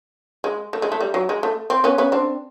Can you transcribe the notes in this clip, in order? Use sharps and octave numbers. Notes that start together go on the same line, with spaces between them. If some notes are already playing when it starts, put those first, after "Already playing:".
G#3
A3
G#3
A3
G3
F#3
G#3
A3
C4
B3 C#4
B3 C#4
C4 D4